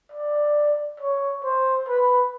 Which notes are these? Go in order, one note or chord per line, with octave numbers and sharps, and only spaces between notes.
D5
C#5
C5
B4